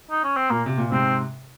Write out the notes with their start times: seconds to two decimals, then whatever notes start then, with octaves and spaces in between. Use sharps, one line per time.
0.11 D#4
0.24 C#4
0.36 C4
0.50 A#2 A#3
0.66 C3
0.78 A#2
0.92 G#2 C3 C4